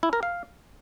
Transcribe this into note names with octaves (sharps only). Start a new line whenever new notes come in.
E4
A#4
F5